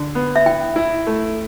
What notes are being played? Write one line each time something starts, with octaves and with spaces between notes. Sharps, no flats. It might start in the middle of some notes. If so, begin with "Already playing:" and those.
Already playing: D3
B3
E5
E4 G5
E4
A3